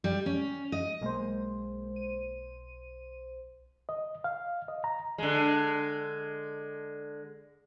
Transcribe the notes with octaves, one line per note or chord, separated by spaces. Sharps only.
G3
C#4
D#5
B1 G#3 A#3 C5
D#7
D#5
F5
D#5
A#5
D3 G#3